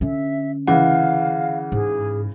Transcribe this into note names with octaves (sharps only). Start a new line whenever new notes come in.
D3 C#4 E5
C#3 E3 F5 F#5
G#2 G#4